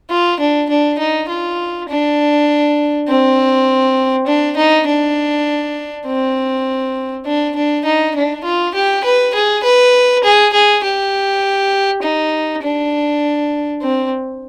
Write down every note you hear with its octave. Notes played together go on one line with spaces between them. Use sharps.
F4
D4
D4
D#4
F4
D4
C4
D4
D#4
D4
C4
D4
D4
D#4
D4
F4
G4
B4
G#4
B4
G#4
G#4
G4
D#4
D4
C4